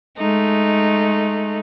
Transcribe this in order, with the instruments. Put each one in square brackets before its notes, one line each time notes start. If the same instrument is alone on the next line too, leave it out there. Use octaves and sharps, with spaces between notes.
[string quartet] G#3 A3 D#4